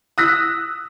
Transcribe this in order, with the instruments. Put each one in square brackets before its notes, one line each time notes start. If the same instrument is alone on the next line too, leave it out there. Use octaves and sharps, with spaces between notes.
[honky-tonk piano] D#6 E6 F#6 A#6 B6